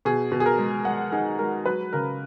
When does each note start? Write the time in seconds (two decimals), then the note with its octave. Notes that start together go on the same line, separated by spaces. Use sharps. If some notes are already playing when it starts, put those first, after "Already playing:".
0.05 B2 G#4
0.32 B2
0.40 G#4
0.46 A#4
0.59 G#3
0.85 G#3 F#5
1.12 D#4 G#4
1.39 G#3 A#4
1.66 F#3 B4
1.93 C#3 A#4